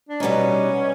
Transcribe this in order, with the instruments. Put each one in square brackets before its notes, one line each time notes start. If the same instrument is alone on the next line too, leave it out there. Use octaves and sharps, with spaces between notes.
[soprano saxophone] D4
[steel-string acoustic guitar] B2 G3 B3 D#4 [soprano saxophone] C#4